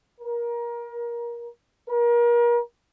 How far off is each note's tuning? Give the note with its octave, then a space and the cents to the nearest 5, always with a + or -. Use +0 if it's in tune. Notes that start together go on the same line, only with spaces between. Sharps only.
A#4 +25
A#4 +35